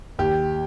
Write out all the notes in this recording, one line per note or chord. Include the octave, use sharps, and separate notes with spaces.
D#2 G4